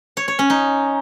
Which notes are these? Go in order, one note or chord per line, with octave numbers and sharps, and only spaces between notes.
C#5
C#5
C#4
D#4